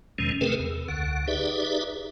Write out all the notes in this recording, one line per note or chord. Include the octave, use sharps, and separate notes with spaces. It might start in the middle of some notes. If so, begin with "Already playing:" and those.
E2 B2 D#3 F3 G#3 C#4
C3 A3 C4 G#4 A#4 B4
E2
C#2 D3 F#5
D#4 G4 G#4 B4 D5 E5